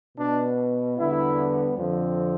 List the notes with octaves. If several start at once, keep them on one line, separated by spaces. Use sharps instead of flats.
B2 B3 D4
E2 D3 G3 B3 E4
F2 D3 F3 C4